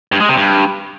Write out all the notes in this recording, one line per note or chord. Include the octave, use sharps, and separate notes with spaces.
G2
G#3
C3
G2